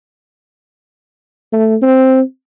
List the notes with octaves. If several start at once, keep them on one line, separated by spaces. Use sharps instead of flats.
A3
C4